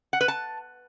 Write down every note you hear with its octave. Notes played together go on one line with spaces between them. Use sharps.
F#5
B4
A5